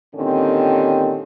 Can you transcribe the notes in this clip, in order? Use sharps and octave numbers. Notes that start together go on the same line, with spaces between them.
A#2 D3 D#3 C4 C#4 G4